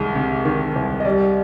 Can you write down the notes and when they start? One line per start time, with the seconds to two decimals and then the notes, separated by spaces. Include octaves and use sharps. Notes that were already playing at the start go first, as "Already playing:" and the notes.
Already playing: C2 D#3 G#3
0.15 C3
0.45 D#3
0.76 C2
1.00 D#5
1.05 G3 D5